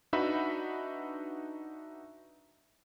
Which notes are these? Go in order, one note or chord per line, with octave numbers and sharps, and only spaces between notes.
D4 D#4 F#4 B4 E5 B5